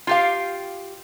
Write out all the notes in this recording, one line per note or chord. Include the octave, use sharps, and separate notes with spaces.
F4 G4 F5